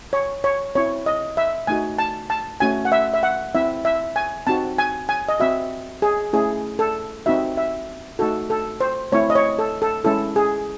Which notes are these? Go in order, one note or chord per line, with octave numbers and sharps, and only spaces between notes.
C#5
C#5
C4 E4 C#5
D#5
E5
A3 D#4 F#4 G#5
A5
A5
A3 C#4 F#4 G#5
F#5
E5
E5
F#5
C4 E4 E5
E5
G#5
C4 D#4 F#4 A5
G#5
G#5
D#5
C4 F#4 E5
G#4
A3 C#4 E4 G#4
A4
C4 D#4 F#4 E5
E5
A3 D#4 F#4 A4
A4
C5
A3 C4 E4 C#5
D#5
C#5
A4
A4
G#3 C#4 E4 A4
G#4